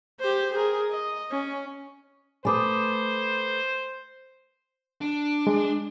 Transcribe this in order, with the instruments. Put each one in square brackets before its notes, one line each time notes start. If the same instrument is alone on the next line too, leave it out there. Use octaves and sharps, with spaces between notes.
[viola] G4 C5
G#4 A#4
D#5
C#4
[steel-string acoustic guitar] A3 B4 [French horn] C5 [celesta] G#5 D6 D#6
[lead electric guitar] D4
[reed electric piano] G#3